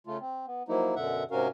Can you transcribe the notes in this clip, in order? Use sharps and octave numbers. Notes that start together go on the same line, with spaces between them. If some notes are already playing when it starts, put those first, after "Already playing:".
C#3 A3 F4
C4
B3
F3 F#3 A#3 D#4 E4
F#2 B2 D3 E5 F#5
G#2 C3 C#4 F#4 A#4 F5